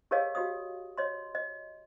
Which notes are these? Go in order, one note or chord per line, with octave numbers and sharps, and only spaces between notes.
G4 G#4 A#4 C#5 D#5 F5
F#4 G4 D#5 D#6
C#5 D#5 C6
D#5